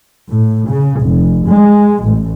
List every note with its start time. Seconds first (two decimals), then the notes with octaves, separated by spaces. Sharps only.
0.29 A2
0.69 C#3
1.01 F1
1.48 G#3
2.04 A1